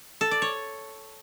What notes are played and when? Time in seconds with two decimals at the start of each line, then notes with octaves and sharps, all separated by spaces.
0.21 A4
0.31 D5
0.42 C#5